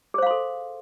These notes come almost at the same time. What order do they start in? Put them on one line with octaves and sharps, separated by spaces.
G#4 C5 F5 C6 A4